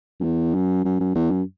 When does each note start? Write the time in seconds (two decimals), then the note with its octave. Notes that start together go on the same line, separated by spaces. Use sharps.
0.20 F#2
0.24 E2
0.55 F#2
0.85 F#2
1.00 F#2
1.15 E2
1.31 F#2